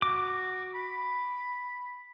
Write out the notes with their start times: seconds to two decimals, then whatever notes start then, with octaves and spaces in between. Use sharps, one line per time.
0.02 F#4 D6
0.74 B5